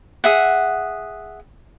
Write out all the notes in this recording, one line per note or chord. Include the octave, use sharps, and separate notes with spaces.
G#4 E5 F#5